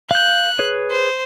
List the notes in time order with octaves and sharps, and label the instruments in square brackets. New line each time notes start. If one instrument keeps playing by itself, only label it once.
[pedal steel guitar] F5 G6 [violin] F#6
[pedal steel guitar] G#4 B4 C#5
[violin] C5